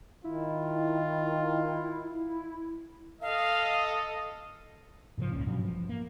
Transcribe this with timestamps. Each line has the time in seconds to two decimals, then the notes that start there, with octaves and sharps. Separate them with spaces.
0.24 D#3 E4 F4
3.21 A4 D#5 F5
5.18 G#2 C#3 E3 F3
5.32 F#1 C#2 A#2 C#4
5.46 G2 B2 F3 F#3
5.64 A1 F3
5.89 A#3